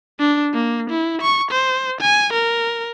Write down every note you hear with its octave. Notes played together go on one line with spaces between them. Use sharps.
D4
A#3
E4
C#6
C5
G#5
A#4